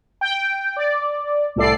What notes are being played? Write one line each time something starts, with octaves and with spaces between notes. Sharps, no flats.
G5
D5
C2 A2 A4 D5 C7